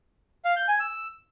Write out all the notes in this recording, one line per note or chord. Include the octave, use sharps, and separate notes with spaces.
F5
G6
G#5
E6